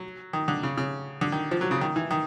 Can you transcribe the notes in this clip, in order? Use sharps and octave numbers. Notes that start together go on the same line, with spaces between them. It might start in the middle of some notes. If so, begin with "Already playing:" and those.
Already playing: F#3
D#3
D3
C#3
C#3
D3
D#3
F3
F#3
C#3
D#3
E3
D#3